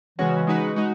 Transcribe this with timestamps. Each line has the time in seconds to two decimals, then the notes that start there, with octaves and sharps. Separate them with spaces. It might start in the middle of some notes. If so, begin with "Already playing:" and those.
0.18 C#3 E3 G#3 C#4 F#4
0.47 G#3 D#4 F#4 B4
0.76 G#3 D#4 F#4